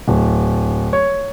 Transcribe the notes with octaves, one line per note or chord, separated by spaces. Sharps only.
D1
C#5